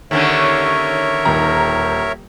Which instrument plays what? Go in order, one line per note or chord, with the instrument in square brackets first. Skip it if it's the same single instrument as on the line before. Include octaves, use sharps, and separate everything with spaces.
[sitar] D#2 D3 C#4 [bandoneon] A#4 C#5 E5
[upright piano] D#1 D#3 A#5